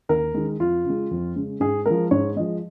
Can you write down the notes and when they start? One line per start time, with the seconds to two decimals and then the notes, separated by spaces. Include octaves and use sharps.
0.09 D#2 A#4
0.34 D#3 G#3
0.60 F2 F4
0.84 C#3
0.90 G#3
1.11 F2
1.36 C#3 G#3
1.60 G#2 G#4
1.86 F3 G#3 A#4
2.11 G#2 C#5
2.36 F3 G#3 D#5